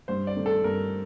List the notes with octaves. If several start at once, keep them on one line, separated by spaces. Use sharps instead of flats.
G2 C5
D5
D#3 A3
A4
G2 A#4